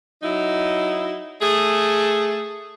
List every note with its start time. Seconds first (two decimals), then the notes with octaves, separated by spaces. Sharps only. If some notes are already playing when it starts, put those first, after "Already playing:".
0.22 F#3 D#4 E4
1.41 A3 G#4